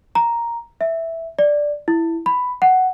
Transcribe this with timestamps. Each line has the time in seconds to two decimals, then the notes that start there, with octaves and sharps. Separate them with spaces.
0.15 A#5
0.81 E5
1.39 D5
1.88 E4
2.26 B5
2.62 F#5